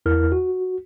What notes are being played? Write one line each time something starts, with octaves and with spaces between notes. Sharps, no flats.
E2 E4 A#4 F6
F#4